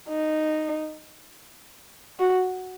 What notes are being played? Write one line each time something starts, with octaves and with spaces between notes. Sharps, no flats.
D#4
F#4